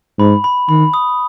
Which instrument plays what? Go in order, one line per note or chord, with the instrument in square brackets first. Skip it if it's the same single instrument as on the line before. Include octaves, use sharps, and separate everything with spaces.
[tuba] G#2 [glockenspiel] B5
[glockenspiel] B5
[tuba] D#3 [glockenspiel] B5
[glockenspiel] D#6